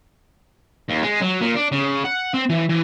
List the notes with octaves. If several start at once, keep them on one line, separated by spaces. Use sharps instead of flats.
D#2
G#3
F#3
A#2
D4
C#3
F#5
C4
E3
E3